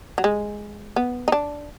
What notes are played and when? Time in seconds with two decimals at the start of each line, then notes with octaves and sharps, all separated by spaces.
0.18 F#3
0.24 G#3
0.96 B3
1.28 D#4
1.32 D4